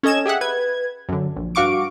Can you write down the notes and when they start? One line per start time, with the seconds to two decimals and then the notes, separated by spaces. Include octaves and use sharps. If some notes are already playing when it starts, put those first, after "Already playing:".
0.03 C#4 A4 D#5 G#6 E7
0.26 G4 G#4 E5 F#5
0.41 B4 G#6
1.09 F#2 D3
1.36 A#1
1.55 G2 F#4 F5 C#6 D6 D7